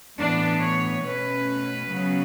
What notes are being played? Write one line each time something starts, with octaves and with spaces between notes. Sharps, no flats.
A2 E3 B3 D4
C#5
B2 A3 C#4 B4
C#3 F#3 B3